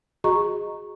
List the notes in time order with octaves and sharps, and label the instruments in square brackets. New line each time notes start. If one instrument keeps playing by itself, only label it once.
[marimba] F#4 G#4 D#5 A#5 C#6